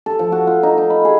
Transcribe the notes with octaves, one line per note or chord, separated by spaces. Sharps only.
A4
F3
F#4
F4
D#4
D#4
B5
G#4